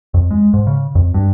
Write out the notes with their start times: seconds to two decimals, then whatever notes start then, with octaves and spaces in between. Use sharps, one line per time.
0.14 F2
0.31 G#3
0.54 G#2
0.67 C#3
0.95 F2
1.14 G2